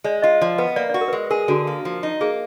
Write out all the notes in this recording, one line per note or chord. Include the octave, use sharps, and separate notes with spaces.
G#3 D5
F4 D#5
F3 D5
B3 B4
A#3 D5
F#4 D5
A#4
B4
G#3 A#4
G#4 A#4
D3 F#4
A#3
F3
D#4
A#3 G#4